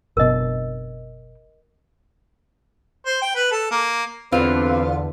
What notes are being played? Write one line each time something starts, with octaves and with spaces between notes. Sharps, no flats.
F#1 B2 A#4 D#5
C5
G5
B4
A4
A#3
E2 D3 B3 C4 F4 B4